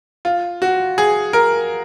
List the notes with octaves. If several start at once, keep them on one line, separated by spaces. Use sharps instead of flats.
F4
F#4
G#4
A#4